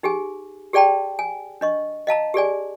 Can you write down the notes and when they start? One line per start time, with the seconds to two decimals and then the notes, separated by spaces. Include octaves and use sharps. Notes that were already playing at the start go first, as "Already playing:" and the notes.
0.03 D#4 G4 G#4 G#5
0.73 G4 G#4 D5 G5 A5 B5
1.19 G#5
1.61 D4 D#5 C#6
2.07 D#5 F5 A5 A#5
2.34 G4 G#4 D5 G#5